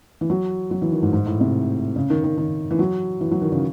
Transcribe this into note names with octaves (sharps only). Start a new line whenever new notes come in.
E3
F#3
F#3
E3
D#3
G#2
G#2
A2
C3
C#3
D#3
D#3
D#3
E3
F#3
E3
F#3
D#3
C#3